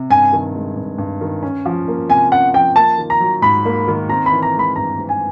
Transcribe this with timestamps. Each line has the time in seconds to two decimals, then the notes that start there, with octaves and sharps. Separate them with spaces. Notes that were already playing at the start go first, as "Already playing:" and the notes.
Already playing: C3
0.10 G2 G#5
0.33 D#3
0.55 G#3
0.76 G2
0.98 G2
1.21 D#3
1.42 C#4
1.66 F3
1.88 A#3
2.09 C3 G#5
2.32 C#4 F#5
2.54 F3 G5
2.76 A#3 A5
2.98 D#3
3.10 A#5
3.20 F#3
3.42 G#2 B5
3.65 A#3
3.88 D#3
4.09 C4 A#5
4.26 E3 B5
4.43 A#5
4.54 G#3
4.59 B5
4.76 G2 A#5
4.99 C4
5.09 G#5